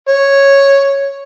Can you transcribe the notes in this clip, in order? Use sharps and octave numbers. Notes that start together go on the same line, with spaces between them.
C#5